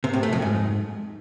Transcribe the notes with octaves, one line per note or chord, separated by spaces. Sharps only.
C3
A2
A3
F2
G#2